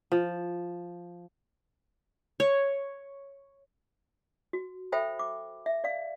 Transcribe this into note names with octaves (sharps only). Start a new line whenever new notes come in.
F3
C#5
F#4
A4 C5 E5 G5 B5
D6
E5
D5 F5